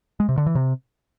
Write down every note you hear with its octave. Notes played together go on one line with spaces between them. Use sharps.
G#3
C3
D3
E3
C3